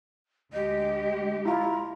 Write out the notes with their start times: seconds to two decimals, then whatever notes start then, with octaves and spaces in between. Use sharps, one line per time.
0.53 D2 G#3 G4 D#5
1.45 E4 F4 A#5